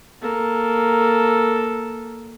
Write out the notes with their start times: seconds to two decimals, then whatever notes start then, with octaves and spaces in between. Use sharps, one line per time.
0.22 A#3 A4